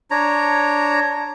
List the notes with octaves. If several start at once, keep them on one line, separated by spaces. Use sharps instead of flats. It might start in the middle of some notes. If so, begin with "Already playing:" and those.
D4 C#5 A#5